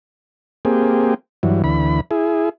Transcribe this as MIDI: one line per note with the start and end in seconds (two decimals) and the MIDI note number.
0.65 1.14 58
0.65 1.14 60
0.65 1.14 67
0.65 1.14 68
1.43 1.62 43
1.43 1.62 52
1.43 1.62 54
1.64 2.01 38
1.64 2.01 52
1.64 2.01 83
2.11 2.49 64
2.11 2.49 68